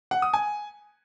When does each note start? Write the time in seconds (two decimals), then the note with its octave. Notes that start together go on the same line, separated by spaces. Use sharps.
0.11 F#5
0.22 D#6
0.34 G#5